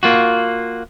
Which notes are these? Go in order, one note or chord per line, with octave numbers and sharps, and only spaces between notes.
A#3 F4 F#4